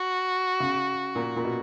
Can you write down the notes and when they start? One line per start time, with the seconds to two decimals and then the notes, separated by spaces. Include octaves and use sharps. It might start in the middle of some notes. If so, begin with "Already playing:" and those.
Already playing: F#4
0.60 C#3
1.15 A#2
1.36 A#2
1.44 B2